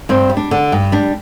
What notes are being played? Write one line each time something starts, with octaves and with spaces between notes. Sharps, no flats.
G2 C4
G3
D4
D3
G2
G3 D4